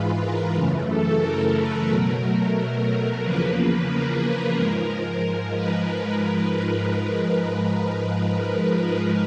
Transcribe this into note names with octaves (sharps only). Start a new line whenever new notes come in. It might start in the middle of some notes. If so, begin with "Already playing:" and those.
Already playing: G#2 E3 G#3 F4 B4
A#4
F#2 C#3 E3 A3
A4
A#4
B4
B2 F#3 A3 A#4
A#4
A#4
E2 C#3 F3 A#3 B4
A#4
B4
G#2 F3 G#3 A#4
A#4
B4